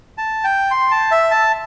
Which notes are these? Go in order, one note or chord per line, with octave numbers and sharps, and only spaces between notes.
A5
G5
C6
A5
E5
A5